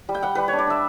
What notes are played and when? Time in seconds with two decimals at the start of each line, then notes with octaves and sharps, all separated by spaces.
0.09 G3
0.14 G5
0.23 G3 F#5
0.35 G3 B4
0.48 C#5
0.53 D4
0.59 D5
0.67 D4 E5